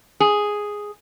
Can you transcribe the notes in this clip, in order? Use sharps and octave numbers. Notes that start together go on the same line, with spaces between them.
G#4